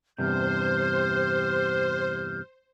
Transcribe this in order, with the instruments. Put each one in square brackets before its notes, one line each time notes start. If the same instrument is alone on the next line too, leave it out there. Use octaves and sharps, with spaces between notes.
[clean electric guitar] E2 G2 C3 [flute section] G4 F6 G6 [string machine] C5